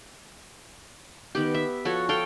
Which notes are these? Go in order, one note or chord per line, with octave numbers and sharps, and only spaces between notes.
D#3 B3 G4
E5
F3 F#4 A4 C#5
A4 F5 G5